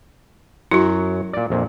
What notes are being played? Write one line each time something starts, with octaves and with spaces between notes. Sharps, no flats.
F#2 F#3 E4 F#4
A#2 D5
A#1 F2 A#2